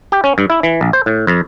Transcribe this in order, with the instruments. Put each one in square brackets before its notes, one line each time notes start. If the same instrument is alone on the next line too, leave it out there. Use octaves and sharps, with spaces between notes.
[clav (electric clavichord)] G4
C#4
G2
E4
E3
A#1
C5
A2
F2